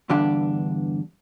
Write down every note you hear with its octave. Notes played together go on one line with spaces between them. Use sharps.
E2 G2 D3 D4 G4 F5